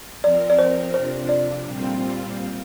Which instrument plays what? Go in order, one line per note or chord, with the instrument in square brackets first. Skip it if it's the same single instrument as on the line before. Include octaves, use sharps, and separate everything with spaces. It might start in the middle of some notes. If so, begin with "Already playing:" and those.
[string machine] F3 C4 A#4 [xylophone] D5
[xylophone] D5
C5
[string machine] F2 C3 F3 D4 [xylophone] C5
[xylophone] D5
[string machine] A#2 G3 C4 F4